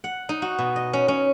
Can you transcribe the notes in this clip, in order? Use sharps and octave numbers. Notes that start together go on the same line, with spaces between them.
F#5
D#4
F#4
B2
D#5
C#4
C#4